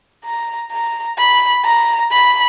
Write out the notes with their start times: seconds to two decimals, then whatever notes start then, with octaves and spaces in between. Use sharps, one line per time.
0.25 A#5
0.72 A#5
1.18 B5
1.65 A#5
2.11 B5